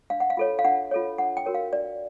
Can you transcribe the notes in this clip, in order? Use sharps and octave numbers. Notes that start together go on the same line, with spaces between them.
D4 F5
F#5
F5
F4 A4 C#5
F5
D4 F#5
F4 A4 C#5
D4 F#5
G5
F#4 A#4 C#5
F5
D4 D5